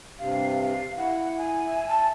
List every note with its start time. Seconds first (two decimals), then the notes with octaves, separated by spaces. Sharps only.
0.19 G2 C3 F5
0.63 F5
0.97 E4 F#5
1.38 G#5
1.66 E5
1.88 A5